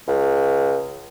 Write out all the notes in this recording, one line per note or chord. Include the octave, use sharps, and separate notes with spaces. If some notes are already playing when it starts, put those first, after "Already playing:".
C#2